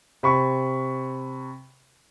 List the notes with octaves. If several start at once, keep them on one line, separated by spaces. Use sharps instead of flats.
C3 B5 C#6